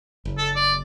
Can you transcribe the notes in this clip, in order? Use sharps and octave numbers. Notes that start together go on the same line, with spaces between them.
F#1
A4
D5